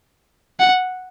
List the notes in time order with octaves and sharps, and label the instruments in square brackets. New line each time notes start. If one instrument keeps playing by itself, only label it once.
[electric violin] F#5